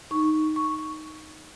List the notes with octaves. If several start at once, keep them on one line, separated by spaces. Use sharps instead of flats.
D#4 C#6
C#6